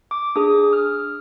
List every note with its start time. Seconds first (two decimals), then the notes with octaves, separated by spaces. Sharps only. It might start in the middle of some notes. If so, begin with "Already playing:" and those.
0.11 D6
0.36 D4 G#4 D#6
0.73 F6